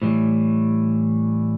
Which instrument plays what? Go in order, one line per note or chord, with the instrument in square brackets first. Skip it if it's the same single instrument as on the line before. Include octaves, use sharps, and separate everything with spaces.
[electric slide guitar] A2 E3 G3